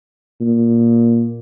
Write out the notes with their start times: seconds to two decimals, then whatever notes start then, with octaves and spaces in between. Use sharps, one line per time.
0.41 A#2